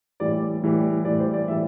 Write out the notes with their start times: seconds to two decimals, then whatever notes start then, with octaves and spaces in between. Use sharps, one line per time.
0.20 A2 E3 G3 D5
0.62 A2 E3 G3
1.05 A2 E3 G3 D5
1.20 C5
1.33 D5
1.48 A2 E3 G3 E5